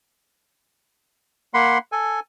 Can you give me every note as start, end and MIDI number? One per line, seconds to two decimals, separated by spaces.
1.54 1.78 58
1.54 1.78 78
1.54 1.78 83
1.54 1.78 84
1.92 2.20 69
1.92 2.20 80